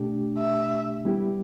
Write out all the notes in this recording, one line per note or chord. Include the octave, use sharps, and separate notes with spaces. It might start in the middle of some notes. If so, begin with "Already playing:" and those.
Already playing: B2 A3 D4 G4
E5
G3 B3 E4 G4